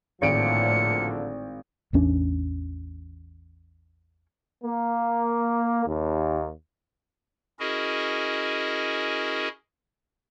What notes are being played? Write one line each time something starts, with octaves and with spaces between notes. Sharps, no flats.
G#1 A2 D3 F3 A#3 C#7 D7
A1 E2 C#4 D4
A#3
D#2
C#4 E4 F#4 G#4 A#4 D#5